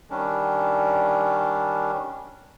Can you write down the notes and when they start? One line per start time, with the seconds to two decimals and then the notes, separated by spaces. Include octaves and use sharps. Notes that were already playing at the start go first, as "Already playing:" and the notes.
0.10 D#3 G3 C#4 D4